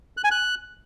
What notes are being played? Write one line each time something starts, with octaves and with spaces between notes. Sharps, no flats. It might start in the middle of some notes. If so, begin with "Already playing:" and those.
F#6
G#5
F#6